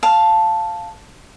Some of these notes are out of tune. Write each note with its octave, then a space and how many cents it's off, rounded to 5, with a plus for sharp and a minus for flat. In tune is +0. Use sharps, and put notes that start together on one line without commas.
F5 +0 A5 +0